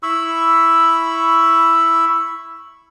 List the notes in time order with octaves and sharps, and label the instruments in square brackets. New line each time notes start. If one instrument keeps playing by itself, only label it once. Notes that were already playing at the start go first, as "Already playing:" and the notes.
[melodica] E4 B5 C#6 E6